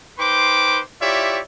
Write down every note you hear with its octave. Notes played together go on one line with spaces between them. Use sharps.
D#4 B4 C5 G5 C6 D6
E4 F4 G4 C#5 D5 E5